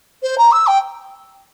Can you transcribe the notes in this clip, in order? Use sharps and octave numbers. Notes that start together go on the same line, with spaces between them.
C5
A#5
E6
G5